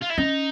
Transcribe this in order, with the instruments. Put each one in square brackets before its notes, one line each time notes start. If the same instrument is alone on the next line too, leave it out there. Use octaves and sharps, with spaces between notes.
[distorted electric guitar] F4
E4
[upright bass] C#4 [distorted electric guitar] D#4